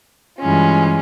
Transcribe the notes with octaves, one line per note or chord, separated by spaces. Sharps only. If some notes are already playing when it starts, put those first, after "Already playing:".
G2 E3 G#3 C#4 F4